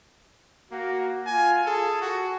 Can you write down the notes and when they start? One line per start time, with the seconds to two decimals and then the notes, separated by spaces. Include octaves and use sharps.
0.72 A#3 F#4
1.26 F4 G#5
1.66 G#4 A4
2.01 F#4